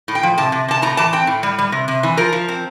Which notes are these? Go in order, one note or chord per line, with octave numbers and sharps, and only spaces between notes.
A2
G5
F3
C3 A5
C3
C3 A5
A2 A#5
E3 A5
C4 G5
A2
G3
G3
C3
C3
E3
F3 A#4
F3
C4